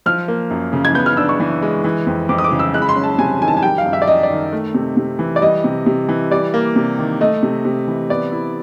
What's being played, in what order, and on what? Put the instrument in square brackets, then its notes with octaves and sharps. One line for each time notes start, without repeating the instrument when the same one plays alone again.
[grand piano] F3 [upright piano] F6
[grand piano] A#3
F#2
C#3
[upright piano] G#6
[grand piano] B3 [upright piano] G6
[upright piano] F6
[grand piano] D4 [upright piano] E6
[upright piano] C#6
[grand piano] E3
G#3
E3
F2
[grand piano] F2 [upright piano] D6
[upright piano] D#6
D6
[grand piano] C#3
[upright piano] E6
[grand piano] G#3 [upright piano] F#6
[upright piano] B5
C6
[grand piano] C#4
[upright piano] A5
[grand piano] C3 [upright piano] G#5
[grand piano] D#3 [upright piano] G#5
[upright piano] A5
G#5
[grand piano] G3 [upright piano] G5
[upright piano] F5
[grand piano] F#2
[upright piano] E5
D5
[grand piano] F#2 [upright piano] D#5
[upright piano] D5
[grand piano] D#3
A3
C3
C3
E3
[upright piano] D5
[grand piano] G3 [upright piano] D#5
[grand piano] C3
C3
E3
[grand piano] G3 [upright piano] D5
[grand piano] A#3
C3
D#3
[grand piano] A3 [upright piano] D#5
[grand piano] C3
C3
E3
[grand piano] B3 [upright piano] D5
[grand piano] E4